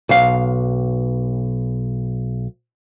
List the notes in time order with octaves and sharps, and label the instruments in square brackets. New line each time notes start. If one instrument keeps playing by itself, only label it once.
[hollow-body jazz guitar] B1 F5